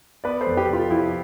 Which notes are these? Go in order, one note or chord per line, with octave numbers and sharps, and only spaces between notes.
B3 B4 D5
A4 C5
F2
G4 B4
C3
F4 A4
F3 E4 G4